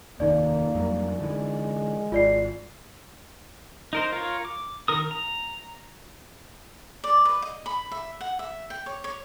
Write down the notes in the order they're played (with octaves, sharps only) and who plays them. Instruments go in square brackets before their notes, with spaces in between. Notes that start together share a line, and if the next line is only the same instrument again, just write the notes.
[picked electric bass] F1 D#2 D#3 [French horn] A#3 [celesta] D#4 D5
[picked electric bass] F2 F#3 G3
[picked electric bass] D3 E3 [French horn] G#3
[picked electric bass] G#1 [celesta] F4 D5 C7
[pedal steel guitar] D#4 A#4 C5
F4 A#4 C#5
D6
D#3 A#4 D#6
A#5
[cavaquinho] D5
B4
D#5
B5
E5
F#5
E5
G5
C#5
C#5